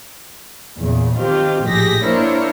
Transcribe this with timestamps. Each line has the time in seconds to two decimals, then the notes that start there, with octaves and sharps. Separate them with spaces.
0.81 E2 A#2 C#3
1.17 D#3 C4 F4 G4
1.65 A#1 A2 G4 G#4 A#6 B6
2.04 A#3 D4 E4 A#4 C5 C#5